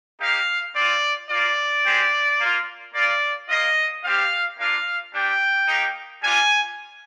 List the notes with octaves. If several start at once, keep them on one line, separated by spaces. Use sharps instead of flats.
A#3 D#4 G4 F5
C4 D5
F4
A#3 F4 D5
G#3 C4 G4
A#3 F4
A#3 F4 D5
A#3 F4 D#5
G3 C4 G4 F5
A#3 D4 F4 F5
G3 D4 G4 G5
A#3 D#4 G4
G3 D4 F4 G#5